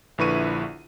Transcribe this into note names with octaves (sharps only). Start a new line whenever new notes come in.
A#1 D3 E4 B4 C#6 D#7